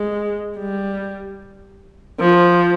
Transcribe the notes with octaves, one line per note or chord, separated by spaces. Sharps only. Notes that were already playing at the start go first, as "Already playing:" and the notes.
Already playing: G#3
G3
F3